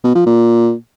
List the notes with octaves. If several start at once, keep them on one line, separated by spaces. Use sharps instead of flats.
B2
F3
A#2